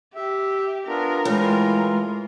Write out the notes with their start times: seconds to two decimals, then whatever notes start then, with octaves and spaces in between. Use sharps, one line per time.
0.15 G4 E5
0.87 B3 D4 F4 A#4
1.25 A2 E3 G#3 F4